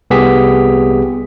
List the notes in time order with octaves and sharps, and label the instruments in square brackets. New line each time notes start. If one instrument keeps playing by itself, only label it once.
[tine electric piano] C2 B3 G4 G#4 B6